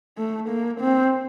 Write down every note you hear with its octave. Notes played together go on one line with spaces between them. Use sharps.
A3
A#3
C4